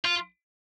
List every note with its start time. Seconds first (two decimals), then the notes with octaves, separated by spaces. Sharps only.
0.05 F4